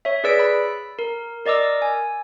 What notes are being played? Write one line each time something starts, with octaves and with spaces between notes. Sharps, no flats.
C#5 E5
G#4 B4 D5 E6 B6 D7
B5
A#4
A#4 D5 D#5 D6 E6
G#5